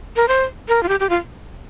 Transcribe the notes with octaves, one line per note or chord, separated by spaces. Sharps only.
A#4
C5
A#4
F4
G4
G4
F4